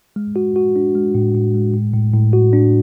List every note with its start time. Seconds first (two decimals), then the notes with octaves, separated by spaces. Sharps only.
0.16 G#3
0.36 F#4
0.56 F#4
0.76 D4
0.95 G#3
1.15 A2
1.35 A2
1.54 G#3
1.74 A2
1.94 A2
2.14 A2
2.33 F#4
2.53 D4